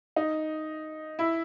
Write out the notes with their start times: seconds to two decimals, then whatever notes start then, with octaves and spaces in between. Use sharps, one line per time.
0.16 D#4
1.19 E4